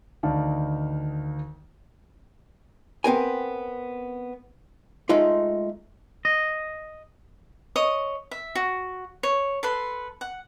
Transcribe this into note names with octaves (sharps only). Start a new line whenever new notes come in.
D2 D#3 D#4 D5 F5 A5
B3 C4 A#4 G#5
G#3 A3 D#4 F4
D#5
C#5 D#5 D#6
E5
F#4
C#5
A4 B4 C6
F#5